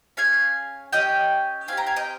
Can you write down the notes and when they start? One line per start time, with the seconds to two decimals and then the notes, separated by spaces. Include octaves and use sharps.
0.17 C#4 G#4 F5 G#5
0.93 C#4 G4 D#5 G5
1.68 C4 D#4 F5 G#5
1.72 G4
1.77 G5 A#5
1.87 F5 G#5
1.96 D#5 G5